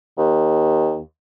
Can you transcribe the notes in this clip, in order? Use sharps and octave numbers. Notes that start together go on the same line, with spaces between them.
D#2